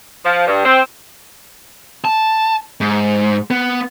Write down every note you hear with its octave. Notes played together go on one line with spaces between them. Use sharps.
F3
G2
C4
A5
G#2
B3